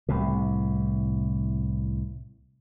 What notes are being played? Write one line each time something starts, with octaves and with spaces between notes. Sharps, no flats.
C2 A2 C3